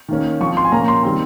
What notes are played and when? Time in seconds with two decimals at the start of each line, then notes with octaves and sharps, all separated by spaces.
0.08 D#3 A#3 C#4
0.41 F3 C4 C#6
0.57 C6
0.65 G#5
0.72 A#2 F3 A#3 C#4 A#5
0.88 C6
1.03 D#3 G3 C4